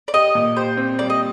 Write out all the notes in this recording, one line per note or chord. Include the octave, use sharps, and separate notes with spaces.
D5
G4 D#5
A#2
G4 C5
C4
G3 D5
D#5